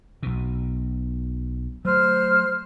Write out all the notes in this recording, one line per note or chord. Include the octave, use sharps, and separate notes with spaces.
B1 B2
F#3 A3 C5 F6